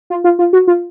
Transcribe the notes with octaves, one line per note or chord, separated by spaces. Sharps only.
F4
F4
F4
F#4
F4